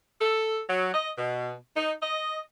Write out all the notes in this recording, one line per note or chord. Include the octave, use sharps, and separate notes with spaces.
A4
F#3
D#5
B2
D#4
D#5